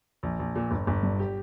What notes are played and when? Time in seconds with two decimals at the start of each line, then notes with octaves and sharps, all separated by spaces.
0.23 A#1
0.39 A#1
0.55 A#2
0.71 G1
0.87 G1
1.03 G2
1.19 G4